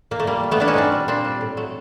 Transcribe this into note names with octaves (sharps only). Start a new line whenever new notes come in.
A#2 A#3
A3
G3 A#3
A#2
A3 B3
G3 D4 E4
C#4 D#4
A#2 C4 D4
G3
A#2 C4 D4
G3
A2
F#3 A3